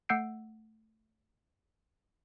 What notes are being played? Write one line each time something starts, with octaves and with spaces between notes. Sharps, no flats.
A3 F#5 E6 G6 C7 D7